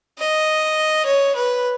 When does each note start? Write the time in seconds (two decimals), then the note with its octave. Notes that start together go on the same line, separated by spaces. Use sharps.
0.19 D#5
1.05 C#5
1.35 B4